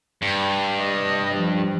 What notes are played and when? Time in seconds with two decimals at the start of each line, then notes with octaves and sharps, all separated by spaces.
0.22 G2
0.80 D#5
1.35 F3 G3